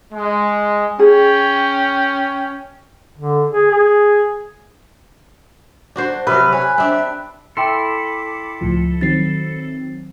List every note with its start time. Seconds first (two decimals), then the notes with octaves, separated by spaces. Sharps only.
0.13 G#3
0.99 C#4 G#4 G5
3.18 D3
3.51 G#4
3.71 G#4
5.96 D4 F#4 C5
6.27 C3 F#3 B4 F6
6.52 C#5 G#5
6.78 C4 D4 E5
7.57 E4 A4 G5 B5 C6 D6 C7
8.61 C#2 A2 F3
9.01 D#3 F#3 C4 A6 C7